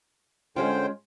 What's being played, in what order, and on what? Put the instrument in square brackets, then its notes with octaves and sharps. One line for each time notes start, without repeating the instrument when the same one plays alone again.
[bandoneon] D3 C5 G5 [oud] G#3 C#4 F4